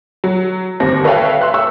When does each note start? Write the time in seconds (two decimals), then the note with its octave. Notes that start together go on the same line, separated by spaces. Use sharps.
0.24 F#3
0.80 G1 D#2 C4 A#6
1.04 A4 B4 C#5 E5 F5 G5
1.41 E5 C6 F#6
1.54 C#6 E6